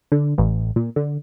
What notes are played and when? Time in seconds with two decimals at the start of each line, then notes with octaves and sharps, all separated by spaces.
0.12 D3
0.38 A1
0.76 A#2
0.96 D3